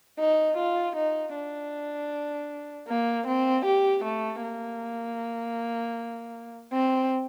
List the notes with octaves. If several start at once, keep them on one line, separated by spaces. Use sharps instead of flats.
D#4
F4
D#4
D4
A#3
C4
G4
A3
A#3
C4